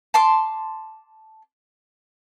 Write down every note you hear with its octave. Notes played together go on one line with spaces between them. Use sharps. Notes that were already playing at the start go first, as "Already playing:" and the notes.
A5 C6 D6